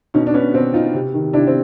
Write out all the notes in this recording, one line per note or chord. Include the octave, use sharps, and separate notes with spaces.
B2 C#4 D#4
D4
B3 C#4
B2 C4
D#4 F4
C3
D#3
C3 D4 E4
C4